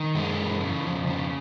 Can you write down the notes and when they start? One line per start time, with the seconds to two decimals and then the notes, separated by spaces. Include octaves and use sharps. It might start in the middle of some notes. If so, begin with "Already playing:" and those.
Already playing: D#3
0.15 F#2 G#3
0.38 E3
0.61 C#3
0.85 F2
1.07 C#3